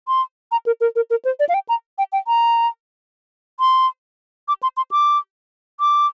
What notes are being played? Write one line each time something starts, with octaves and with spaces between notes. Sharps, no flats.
C6
A#5
A#4
A#4
A#4
A#4
C5
D5
F5
G5
A#5
G5
G5
A#5
C6
D6
C6
C6
D6
D6